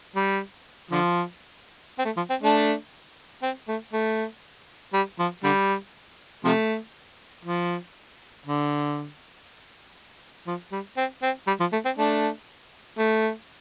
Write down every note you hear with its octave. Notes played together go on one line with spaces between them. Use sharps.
G3
D3 F3
C4
A3
F3
C4
A3 D4
C4
A3
A3
G3
F3
D3 G3
C3 F3 A3
F3
D3
F3
G3
C4
C4
G3
F3
A3
C4
A3 D4
A3